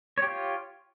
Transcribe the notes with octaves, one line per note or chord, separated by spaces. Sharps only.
F4 G4 C#5